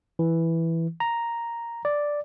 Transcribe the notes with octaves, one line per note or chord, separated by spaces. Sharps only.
E3
A#5
D5